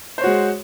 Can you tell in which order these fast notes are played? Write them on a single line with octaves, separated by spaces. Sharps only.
C5 C#5 F#4 G#3